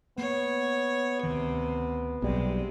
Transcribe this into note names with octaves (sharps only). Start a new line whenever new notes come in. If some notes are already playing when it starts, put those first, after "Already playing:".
A#3 B3 C#5
D2 C3 D#3
B1 C3 G3 G#3 A#3 C4